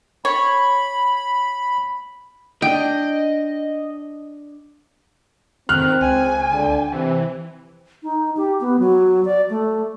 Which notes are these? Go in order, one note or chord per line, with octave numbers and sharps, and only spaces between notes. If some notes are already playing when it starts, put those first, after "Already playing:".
C#5 B5
D4 D#5 G5
D#3 C4 F6 F#6
C#2 G#5
D3
C3 E3
D#4
G4
B3
F#3
D5
A3